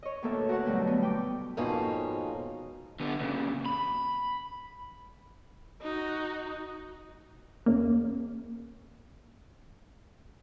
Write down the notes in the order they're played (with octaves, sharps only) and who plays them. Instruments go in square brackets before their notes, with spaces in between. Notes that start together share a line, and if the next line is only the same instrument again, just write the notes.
[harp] C#5 D#5
D2 A2 A#3 B3 A4 E5
F#4 A#4 B4 C#5 F#5
B2 D3 F#3 G3 A3
B3
G5 B5 D6
[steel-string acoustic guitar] F2 G#2 B2 A#3 C#4 D#4
[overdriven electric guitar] D3 B3
A#2 C#3
B5
[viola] D#4 F#4
[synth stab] E2 C#3 A#3